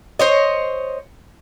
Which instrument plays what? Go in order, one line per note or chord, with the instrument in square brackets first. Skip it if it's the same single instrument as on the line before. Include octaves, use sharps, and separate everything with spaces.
[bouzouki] C5 C#5 D#5